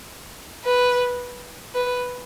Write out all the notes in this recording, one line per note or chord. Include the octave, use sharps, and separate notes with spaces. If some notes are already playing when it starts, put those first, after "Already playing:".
B4
B4